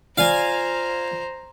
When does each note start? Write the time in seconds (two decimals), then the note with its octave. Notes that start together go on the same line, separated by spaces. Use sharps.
0.18 F4 C5 D5 F5 G#5 A#5